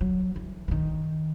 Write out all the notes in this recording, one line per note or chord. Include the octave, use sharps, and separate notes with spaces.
F#3
E3
E3
D#3